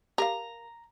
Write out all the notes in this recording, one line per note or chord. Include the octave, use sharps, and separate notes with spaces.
G4 A#4 F5 A#5